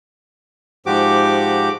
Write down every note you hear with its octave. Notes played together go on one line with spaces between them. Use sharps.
G#2 F3 F#4 G4 D6